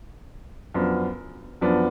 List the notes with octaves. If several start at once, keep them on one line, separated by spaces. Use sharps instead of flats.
F#2 F3 B3 D4
F#2 F3 B3 D4